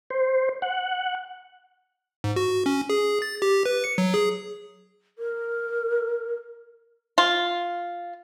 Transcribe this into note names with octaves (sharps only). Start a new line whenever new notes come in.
C5
F#5
G#2
F#4
C#4
G#4
A6
G4
B4
C#7
F#3
G#4
A#4
F4